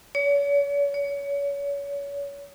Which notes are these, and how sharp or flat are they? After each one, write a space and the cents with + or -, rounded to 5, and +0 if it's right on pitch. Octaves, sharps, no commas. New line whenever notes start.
C#5 +40
C#5 +30